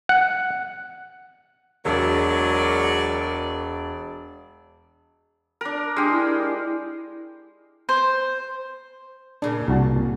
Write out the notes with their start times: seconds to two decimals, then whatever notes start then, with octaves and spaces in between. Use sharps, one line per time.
0.09 F#5
1.85 E1 F#3 G#4 A#4 D5
5.61 D4 A#4
5.97 G#3 D4 G4
6.12 E4
7.89 C5
9.42 A#2 C#3 A#3 D4
9.68 C2 F#4 A5